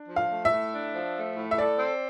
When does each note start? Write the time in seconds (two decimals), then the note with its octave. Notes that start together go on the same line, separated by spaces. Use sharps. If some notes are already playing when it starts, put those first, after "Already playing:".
Already playing: D4
0.08 F3
0.16 F5
0.30 A3
0.45 E5
0.51 A2
0.73 D4
0.94 F3
1.16 A3
1.37 A2
1.51 E5
1.58 A4 D5
1.79 C4